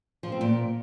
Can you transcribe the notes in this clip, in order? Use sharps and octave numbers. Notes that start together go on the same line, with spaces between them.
F3
C4
A#2